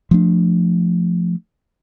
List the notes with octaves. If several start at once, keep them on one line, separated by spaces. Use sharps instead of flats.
F3 A3 D4